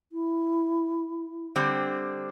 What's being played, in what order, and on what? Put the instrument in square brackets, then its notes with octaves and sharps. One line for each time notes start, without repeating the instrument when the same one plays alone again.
[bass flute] E4
[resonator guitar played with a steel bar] D3 G3 C4